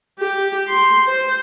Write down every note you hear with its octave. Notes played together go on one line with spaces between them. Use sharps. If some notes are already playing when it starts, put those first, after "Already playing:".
G4
C6
C5